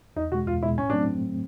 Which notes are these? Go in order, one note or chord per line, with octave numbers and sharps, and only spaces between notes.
E2 D#4
B2 G#3 F#4
E2 F4
B2 G#3 E4
A2 C#4
F#3 A3 C4 D4